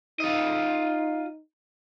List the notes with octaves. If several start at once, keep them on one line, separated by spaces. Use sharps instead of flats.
D#4 F4 D#5